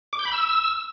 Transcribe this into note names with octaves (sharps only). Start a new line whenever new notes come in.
D6
G6
B5
E6